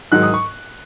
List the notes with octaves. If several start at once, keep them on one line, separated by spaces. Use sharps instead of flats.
G#2 D#3 F#3 F#6
D#6
C#6